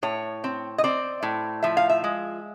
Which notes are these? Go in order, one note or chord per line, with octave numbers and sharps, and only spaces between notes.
A2 C#5
C4
D#5
C4 D5
A2
F3 E5
F5
E5
G#3